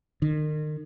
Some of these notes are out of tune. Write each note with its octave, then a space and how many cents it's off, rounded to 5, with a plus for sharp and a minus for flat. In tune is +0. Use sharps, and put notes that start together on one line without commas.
D#3 -35